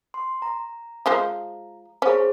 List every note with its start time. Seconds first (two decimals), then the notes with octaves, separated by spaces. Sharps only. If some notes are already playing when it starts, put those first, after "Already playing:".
0.14 C6
0.42 A#5
1.06 F3 G#3 C5
2.02 C#4 G#4 C5